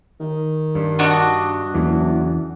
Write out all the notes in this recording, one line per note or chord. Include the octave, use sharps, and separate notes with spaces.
D#3
G2
D4 F#4 D#5
F#1 E2 E3